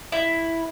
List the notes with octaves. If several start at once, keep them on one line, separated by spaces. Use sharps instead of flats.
E4